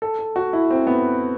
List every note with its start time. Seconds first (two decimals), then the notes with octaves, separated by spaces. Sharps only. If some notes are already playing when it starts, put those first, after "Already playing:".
0.02 A4
0.19 A4
0.36 F#4
0.53 E4
0.71 C4
0.87 B3